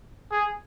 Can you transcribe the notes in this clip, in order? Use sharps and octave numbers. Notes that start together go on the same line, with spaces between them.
G#4